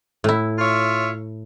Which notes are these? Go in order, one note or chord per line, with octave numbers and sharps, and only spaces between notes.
A2 E4
F4 C#5 E5